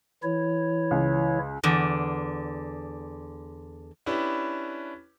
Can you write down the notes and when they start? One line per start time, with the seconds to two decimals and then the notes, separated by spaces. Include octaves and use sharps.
0.23 E3 E4 C#5
0.91 C#2
1.63 E2 D3
4.06 C#4 D4 E4 G4 B4